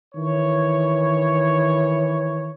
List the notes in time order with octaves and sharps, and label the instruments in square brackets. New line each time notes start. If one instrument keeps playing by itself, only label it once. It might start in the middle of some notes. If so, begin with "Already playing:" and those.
[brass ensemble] D#3 E3 C#5